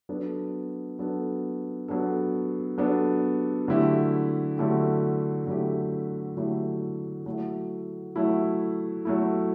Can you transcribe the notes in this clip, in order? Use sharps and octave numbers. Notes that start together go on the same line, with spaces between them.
F#3 B3 D4 A4
F#3 B3 D4 A4
F#3 B3 D4 A4
F#3 B3 D4 A4
D3 F#3 A3 E4 G4
D3 F#3 A3 E4 G4
D3 F#3 A3 E4 G4
D3 F#3 A3 E4 G4
F#3 A3 E4
F#3 A3 E4
F#3 A3 E4